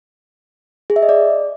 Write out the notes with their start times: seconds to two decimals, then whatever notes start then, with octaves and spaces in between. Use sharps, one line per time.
0.90 G#4
0.96 E5
1.02 D#5
1.09 D5